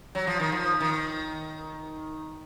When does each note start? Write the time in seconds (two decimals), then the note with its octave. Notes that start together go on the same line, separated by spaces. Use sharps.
0.15 F#3
0.27 F3
0.39 D#3
0.52 F3
0.80 D#3